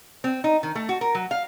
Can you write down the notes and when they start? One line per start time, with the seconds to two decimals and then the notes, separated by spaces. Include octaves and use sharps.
0.24 C4
0.44 D#4
0.63 D#3
0.75 A3
0.89 F#4
1.01 A#4
1.15 F#3
1.31 F5